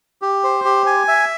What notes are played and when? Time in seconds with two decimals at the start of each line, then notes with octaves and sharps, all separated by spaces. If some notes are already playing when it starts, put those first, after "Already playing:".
0.22 G4
0.44 C5
0.65 G4
0.86 G#5
1.08 E5